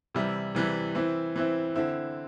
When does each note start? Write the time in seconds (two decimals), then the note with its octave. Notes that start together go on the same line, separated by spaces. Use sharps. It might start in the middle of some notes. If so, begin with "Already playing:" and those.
0.15 C3 E3 G3 E4
0.55 C3 E3 G3 E4
0.95 E3 C4 E4
1.36 E3 C4 E4
1.75 D3 C4 E4